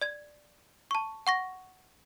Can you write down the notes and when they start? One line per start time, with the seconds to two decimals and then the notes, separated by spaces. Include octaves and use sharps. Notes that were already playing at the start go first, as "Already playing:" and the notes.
0.01 D5 G#6
0.91 A5 C#6
1.27 F#5 C#6 A#6